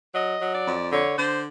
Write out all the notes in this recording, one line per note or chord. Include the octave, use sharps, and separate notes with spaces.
F#3 D#5
F#3
D5
F2
D3 C#5
D3 C5